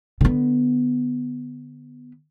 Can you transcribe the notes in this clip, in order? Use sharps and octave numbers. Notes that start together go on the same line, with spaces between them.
D3 B3